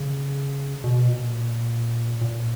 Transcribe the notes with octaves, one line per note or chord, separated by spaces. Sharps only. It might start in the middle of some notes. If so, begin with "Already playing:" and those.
Already playing: C#3
B2
A#2
A#2